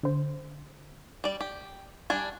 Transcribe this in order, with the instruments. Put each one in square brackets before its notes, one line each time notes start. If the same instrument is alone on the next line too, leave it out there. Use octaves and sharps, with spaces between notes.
[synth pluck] D3 C5
[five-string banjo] G3 D5
G4
G3 D4 G#5